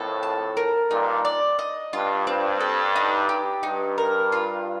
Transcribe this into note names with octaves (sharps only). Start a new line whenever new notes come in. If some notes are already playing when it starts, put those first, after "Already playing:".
Already playing: F2 A2 A#3 A4
A5
A#4
G2 A#2 D#4
D5
D#5
G2 F4
G2 C4
A4
D#4
G4
G2 D#4
A#4
F4